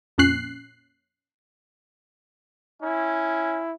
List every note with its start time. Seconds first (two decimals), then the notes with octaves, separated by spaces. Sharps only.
0.18 F2 A#2 C#4 F#6 C7
2.82 C#4 E4